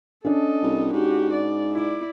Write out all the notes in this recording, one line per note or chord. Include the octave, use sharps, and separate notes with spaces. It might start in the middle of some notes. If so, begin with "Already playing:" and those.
C#4 D4 A4 D#5
C2
G#2 F#4 G4
D5
E4 D5